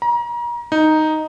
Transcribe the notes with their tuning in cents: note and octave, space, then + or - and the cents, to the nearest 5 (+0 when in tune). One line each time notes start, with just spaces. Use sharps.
A#5 +35
D#4 +0